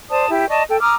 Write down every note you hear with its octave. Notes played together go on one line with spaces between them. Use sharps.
C5 D5 A5 D#6
E4 G4
D5 D#5 A5 C#6
A4 G5
A#5 D6 D#6 F6